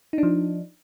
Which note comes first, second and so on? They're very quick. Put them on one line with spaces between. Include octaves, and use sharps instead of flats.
D#4 D4 F3